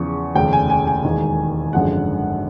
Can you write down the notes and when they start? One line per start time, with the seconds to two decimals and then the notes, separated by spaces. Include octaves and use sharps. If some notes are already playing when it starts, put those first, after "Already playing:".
Already playing: E2 C#3 F3 C#6
0.34 F1 D#2 C#3 F3 G5
0.53 G#5
0.70 G#5
0.87 G#5
1.04 E1 D#2 D#3 G#3
1.73 G#1 F#2 D3 F3 G#3 F#5